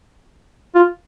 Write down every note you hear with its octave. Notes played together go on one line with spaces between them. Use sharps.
F4